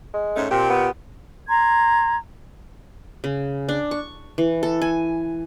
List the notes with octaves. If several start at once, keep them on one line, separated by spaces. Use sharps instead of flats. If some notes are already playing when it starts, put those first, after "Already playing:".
G#3
G#2 A3 C#4
A#2 C4 G4
B3
A#5 C6 G#6
C#3
D4
C#6
E3
A4
G#5